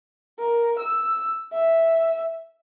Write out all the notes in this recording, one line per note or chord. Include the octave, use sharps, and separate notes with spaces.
A#4
E6
E5